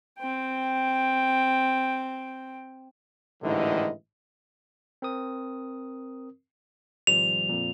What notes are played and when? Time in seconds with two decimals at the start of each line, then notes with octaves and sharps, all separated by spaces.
0.19 C4 G5
3.42 A1 G#2 D3 D#3 E4 D#5
5.02 C4 A#4 D#6
7.07 G#1 F3 G3 F7
7.49 F2 A#2